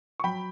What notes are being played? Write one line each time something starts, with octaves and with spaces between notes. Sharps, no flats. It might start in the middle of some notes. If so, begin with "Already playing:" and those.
C#6
F#3 G5 B5